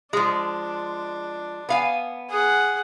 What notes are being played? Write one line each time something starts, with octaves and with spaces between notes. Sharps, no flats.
F3 G#3 D4
B3 F5 G#5
G#4 F#5